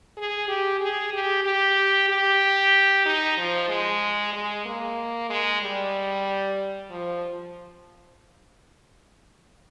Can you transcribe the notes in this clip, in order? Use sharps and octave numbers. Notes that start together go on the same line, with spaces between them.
G#4
G4
G#4
G4
G4
G4
D#4
F3
G#3
G#3
A#3
G#3
G3
F3